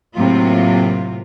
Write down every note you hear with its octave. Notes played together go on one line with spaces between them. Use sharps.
A2 C3 F#3 A#3 C4 F4